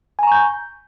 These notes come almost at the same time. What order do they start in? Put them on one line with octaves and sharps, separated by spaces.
G#5 A#5 C#6 G6